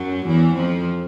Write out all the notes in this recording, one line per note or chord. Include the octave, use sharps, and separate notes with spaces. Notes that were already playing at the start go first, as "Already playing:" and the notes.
Already playing: F#2 F#3
E2 E3
F2 F3